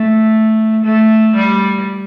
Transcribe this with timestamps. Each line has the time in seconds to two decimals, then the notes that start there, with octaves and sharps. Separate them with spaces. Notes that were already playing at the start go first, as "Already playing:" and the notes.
Already playing: A3
0.84 A3
1.36 G3